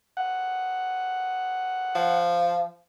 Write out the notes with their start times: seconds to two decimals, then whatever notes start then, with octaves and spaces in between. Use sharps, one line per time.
0.17 F#5
1.95 F3